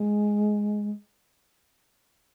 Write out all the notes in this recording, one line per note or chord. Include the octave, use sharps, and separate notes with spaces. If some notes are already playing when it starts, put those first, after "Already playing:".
Already playing: G#3